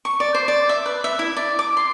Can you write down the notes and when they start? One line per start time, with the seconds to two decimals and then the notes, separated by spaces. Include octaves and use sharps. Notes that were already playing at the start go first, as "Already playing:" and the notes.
0.05 C#6
0.20 D5
0.35 C5
0.48 D5
0.69 E5
0.86 B4
1.04 E5
1.19 E4
1.37 D5
1.59 D6
1.77 C6